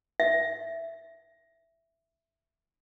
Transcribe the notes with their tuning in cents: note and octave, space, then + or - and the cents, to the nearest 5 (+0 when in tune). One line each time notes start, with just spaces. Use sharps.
E5 +5